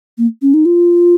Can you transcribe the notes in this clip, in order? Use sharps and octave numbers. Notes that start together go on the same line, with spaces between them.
A#3
C#4
D#4
F4